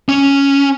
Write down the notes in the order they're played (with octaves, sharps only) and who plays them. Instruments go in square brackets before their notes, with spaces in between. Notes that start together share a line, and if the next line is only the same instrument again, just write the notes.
[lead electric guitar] C#4